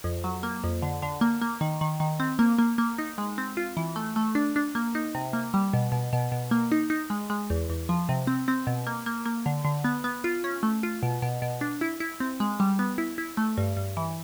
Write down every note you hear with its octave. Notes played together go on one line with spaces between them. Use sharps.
F2
F#3
A#3
F2
D3
D3
A#3
A#3
D#3
D#3
D#3
C4
A#3
A#3
A#3
D#4
G#3
C4
F4
E3
A3
A3
D4
D4
A#3
D#4
C3
A#3
G3
B2
B2
B2
B2
A#3
D#4
D#4
G#3
G#3
E2
E2
F3
C3
C4
C4
B2
A#3
A#3
A#3
D3
D3
B3
B3
F4
C#4
A3
F4
B2
B2
B2
D4
E4
E4
C4
G#3
G3
B3
E4
E4
A3
G2
G2
E3